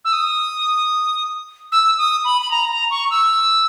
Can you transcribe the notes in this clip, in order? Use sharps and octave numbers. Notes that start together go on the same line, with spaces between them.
E6
D#6
E6
D#6
B5
B5
A#5
A#5
C#6
E6